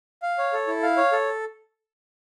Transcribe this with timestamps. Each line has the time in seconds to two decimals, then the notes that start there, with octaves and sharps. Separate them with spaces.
0.22 F5
0.38 C#5
0.53 A4
0.67 E4
0.83 F5
0.97 C#5
1.12 A4